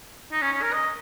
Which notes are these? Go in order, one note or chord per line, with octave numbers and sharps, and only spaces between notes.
D#4
C#4
C#4
A#4
D#5